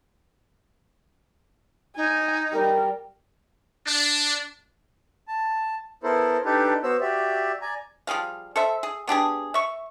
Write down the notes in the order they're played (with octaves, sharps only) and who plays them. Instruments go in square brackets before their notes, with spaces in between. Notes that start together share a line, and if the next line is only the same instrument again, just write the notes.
[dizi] D#4 [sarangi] G#5
[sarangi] G3 [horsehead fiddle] A#4
[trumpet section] D4
[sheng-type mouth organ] A5
B3 E4 A4 A#4 C5
D4 D#4 G4 A4 B4
B3 F#4 C5 C#5 E6
F#4 G4 D5 E5
D5 G#5 A#5
[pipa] F3 G3 G#4 F5
A4 C5 E5
G#4
B3 D4 G4 G#4
E5 C#6